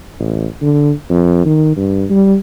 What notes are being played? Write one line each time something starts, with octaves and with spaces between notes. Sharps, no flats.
A1
D3
F2
D#3
G2
G3